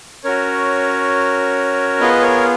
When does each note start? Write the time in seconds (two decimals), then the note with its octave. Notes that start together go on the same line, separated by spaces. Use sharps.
0.24 C#4 F#4 A#4 C#5
2.00 B3 F4 G#4 B4 D#5
2.22 A#4 C#5